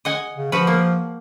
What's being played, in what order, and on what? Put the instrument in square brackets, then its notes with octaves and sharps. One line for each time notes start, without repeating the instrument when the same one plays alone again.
[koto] D#5 F#5 G#5
[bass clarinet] C#3
[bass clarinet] F3 [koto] F#4 B4
[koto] A#3